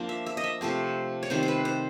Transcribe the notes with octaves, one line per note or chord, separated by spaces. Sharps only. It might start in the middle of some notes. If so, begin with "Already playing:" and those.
Already playing: F3 A#3 D4
E5
E5
D#5
E5
C3 F3 A3 C4
C#5
C3 D#3 G3 C5
C5
B4
C5